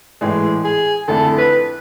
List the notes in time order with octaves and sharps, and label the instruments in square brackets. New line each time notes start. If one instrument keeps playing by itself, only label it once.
[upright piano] A2 E3 G#3 [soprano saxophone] G#4
[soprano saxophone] G#4
[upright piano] F2 D3 A3 E4 [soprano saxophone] A4
[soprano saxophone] B4